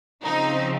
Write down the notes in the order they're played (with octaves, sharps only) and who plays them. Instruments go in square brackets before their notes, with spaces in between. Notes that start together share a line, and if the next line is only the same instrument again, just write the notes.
[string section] C#3 F3 C4 D#4